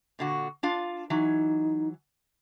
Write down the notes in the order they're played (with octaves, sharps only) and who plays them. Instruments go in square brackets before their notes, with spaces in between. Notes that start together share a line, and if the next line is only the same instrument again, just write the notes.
[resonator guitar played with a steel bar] A#2 D3 F#4
D4 F4 F5
[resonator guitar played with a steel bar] E3 F#3 [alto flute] D#4